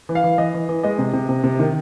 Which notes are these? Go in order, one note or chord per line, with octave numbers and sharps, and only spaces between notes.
E3
F5
E3
E3 D#5
E3
E3
G#3 D#5
C3
C3
C3
C3
D#3